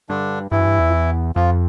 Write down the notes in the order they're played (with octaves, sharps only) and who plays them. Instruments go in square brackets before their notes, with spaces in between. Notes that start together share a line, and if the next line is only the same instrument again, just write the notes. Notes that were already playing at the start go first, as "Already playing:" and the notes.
[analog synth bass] G2 [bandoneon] D3 D4
[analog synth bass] G2 [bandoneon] E3 E4
[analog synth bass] F#2
G2
E2
F2
E2
[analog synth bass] F2 [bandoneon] F3 F4